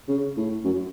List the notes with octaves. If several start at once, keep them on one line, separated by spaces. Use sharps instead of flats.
C#3
A2
F#2